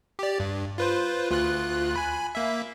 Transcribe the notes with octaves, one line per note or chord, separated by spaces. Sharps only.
G4 D5
G2
F4 B4 C5
D2 F4 F#6
G#5 B5
A#3 E5